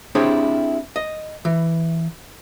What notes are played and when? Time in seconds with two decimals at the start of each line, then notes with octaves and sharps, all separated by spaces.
0.15 C4 D4 E4 G4 G#4 C#5
0.96 D#5
1.45 E3